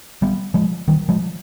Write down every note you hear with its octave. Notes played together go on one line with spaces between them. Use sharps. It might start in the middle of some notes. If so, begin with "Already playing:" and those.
G3 B3
F3 G#3
D#3 G3
F3 G#3